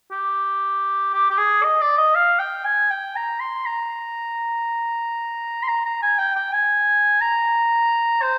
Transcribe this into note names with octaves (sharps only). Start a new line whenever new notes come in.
G4
G4
G4
G#4
D#5
D5
D#5
F5
G5
G#5
G5
A#5
C6
A#5
C6
A#5
A#5
G#5
G5
G5
G#5
A#5
C5